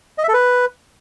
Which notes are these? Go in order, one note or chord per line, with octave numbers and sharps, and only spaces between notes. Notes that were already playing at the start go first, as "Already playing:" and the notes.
D#5
E5
A4
B4